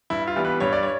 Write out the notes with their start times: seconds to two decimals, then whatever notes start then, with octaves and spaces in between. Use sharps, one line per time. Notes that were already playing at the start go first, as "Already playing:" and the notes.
0.10 G2 E4
0.27 F4
0.36 E3 G3 B3
0.45 B4
0.60 G2 C#5
0.73 D5
0.83 C#5